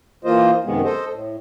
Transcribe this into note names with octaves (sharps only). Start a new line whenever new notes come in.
E3 A#3 F4 C5 D#5
F#2 C3 D#3 G#3 B3
A4 C5 D#5
A2